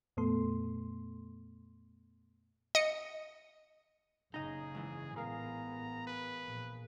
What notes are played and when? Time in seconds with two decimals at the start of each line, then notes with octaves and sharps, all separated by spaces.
0.17 F2 A#2 A3 B3 A4 C6
2.75 D#5 C#7
4.34 F#1 C#3 D#4 G#4 D#5 A#5
4.75 G#2 E3
5.16 A1 B3 G#4 A#4 F5 A#5
6.07 B4
6.46 A#1